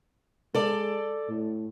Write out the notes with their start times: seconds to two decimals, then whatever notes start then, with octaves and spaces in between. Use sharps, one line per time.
0.55 G#3 A4 D5
1.29 A2